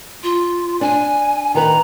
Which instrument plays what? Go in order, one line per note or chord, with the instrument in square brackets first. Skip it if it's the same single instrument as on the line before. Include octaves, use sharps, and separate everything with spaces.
[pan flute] F4
[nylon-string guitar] D4 [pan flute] G#5
[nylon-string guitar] D#3 A#4 B4 [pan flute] A#5